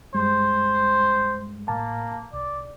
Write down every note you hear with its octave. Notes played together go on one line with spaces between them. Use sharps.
G2 G3 G#3 C5
A2 A#3 A5
C2 D5